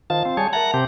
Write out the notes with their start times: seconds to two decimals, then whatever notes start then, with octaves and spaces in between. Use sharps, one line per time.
0.10 D#3 F4 C5 F5 A5
0.25 C4
0.37 G3 G#4 C#5 G#5 A5
0.53 A#4 E5 F#5 A5 A#5
0.74 C3 C4 G4